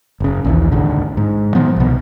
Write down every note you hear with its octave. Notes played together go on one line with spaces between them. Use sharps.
F#1 C#3
A#1 D#2 E3
G#1 C#2 D3
G#2
A#2 D#3 F3 B3
C2 B2